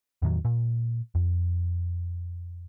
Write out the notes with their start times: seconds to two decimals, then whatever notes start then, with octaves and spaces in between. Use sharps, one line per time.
0.22 E2 A2 D#3 F#3
0.45 A#2
1.15 F2